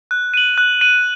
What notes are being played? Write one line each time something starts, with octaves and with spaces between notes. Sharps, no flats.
F#6
D#7 F#7
F#6
D#7 F#7